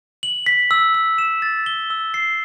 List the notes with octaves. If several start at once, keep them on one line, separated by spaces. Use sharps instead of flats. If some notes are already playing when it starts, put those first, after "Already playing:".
F#7
B6
E6
E6
E7
A6
G7
E6
C7